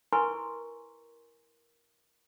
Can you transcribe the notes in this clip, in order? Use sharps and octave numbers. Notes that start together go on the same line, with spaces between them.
E4 A#4 B4 G#5 C6 C#6